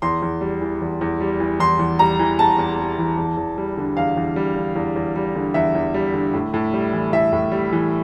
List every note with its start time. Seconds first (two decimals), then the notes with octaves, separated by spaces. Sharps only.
0.02 E2 C6
0.22 E2
0.41 G3
0.61 E3
0.82 E2
1.01 E2
1.21 G3
1.40 E3
1.60 E2 C6
1.79 E2
1.99 G3 A#5
2.19 E3
2.39 E2 A5
2.59 E2
2.79 G3
2.99 E3
3.18 E2
3.37 E2
3.58 G3
3.77 D3
3.97 E2 F5
4.17 E2
4.36 G3
4.56 D3
4.76 E2
4.96 E2
5.16 G3
5.35 D3
5.54 E2 E5
5.75 E2
5.94 G3
6.14 D3
6.34 A2
6.54 A2
6.73 G3
6.93 E3
7.13 A2 E5
7.33 A2
7.52 G3
7.73 E3